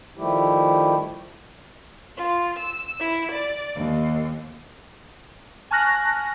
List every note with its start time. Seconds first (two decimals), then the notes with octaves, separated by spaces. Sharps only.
0.17 D#3 F3 G3 A3 E4 G4
2.18 F4
2.58 E6
3.00 E4
3.32 D5
3.76 D#2
5.71 G#5 A5 C#6 F6 F#6 A#6